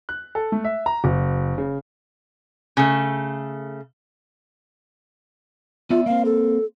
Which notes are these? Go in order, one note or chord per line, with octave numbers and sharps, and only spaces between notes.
F#6
A4
A3
E5
A#5
F#1
C#3
C#3 A3
B3 F4 D5 E5
A#3 C4 F5
A4